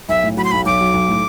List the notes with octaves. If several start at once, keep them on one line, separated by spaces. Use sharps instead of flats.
B1 E5
A2
F#3 B5
C6
B1 B5
B1 D6
F#3
B1
A2